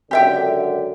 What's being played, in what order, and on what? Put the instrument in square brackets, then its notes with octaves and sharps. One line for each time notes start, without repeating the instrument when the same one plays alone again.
[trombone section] C#2 F#2 D3 [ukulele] G4 E5 G5